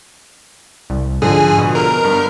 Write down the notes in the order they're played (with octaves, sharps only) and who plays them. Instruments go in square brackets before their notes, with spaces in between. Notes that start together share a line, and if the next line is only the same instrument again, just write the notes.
[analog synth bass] C2
[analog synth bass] G#2 [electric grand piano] D3 F3 [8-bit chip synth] G#4
[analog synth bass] B2
[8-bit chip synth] A#4
[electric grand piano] G2 B3